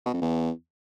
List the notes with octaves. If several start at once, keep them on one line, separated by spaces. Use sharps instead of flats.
B2
F2
E2